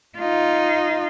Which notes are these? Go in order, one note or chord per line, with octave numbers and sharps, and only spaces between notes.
D#4 F4